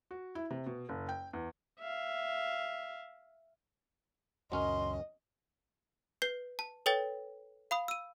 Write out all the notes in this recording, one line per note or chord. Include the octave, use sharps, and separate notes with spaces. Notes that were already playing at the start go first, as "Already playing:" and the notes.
F#4
E4
C3
B2
F#1
G5
E2
E5 F5
C#2 F#2 F#3 C#4 A#4 D#5 C6
B4 G6 C7
A5
A4 B4 C#5 G5 A6
F5 B5 D#6
E6 D#7